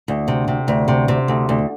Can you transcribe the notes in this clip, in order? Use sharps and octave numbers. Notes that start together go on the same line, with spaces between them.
D2
C3
C3
D2
C3
C3
D2
D2